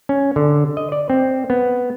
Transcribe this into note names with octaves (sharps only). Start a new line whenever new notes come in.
C#4
D3
D#5
D5
C4
B3